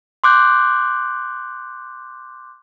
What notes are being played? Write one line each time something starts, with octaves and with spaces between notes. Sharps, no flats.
C6 D6 F#6 G6